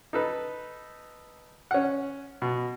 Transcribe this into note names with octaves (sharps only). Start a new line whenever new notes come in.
D#4 A4 B4
C#4 F#5
B2